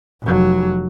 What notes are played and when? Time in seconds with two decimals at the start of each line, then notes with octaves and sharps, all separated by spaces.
0.22 F1 F#3